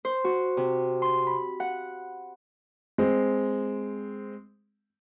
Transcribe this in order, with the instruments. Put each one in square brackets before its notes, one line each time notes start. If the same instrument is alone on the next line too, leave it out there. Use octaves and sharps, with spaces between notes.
[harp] C5
F#4
C3
C6
B5
F#5
[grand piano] G#3 C4